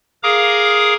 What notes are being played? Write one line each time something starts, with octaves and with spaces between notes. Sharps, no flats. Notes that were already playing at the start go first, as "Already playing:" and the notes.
G#4 A#4 F5 A#5 D6 D#6